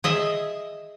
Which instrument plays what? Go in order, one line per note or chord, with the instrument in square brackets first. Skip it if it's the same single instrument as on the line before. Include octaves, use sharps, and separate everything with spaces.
[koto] G#4 D#5 E5